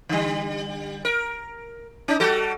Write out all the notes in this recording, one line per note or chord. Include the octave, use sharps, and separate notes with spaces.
D3 G3
A#4
C#4 D#4
G3 F#4 A4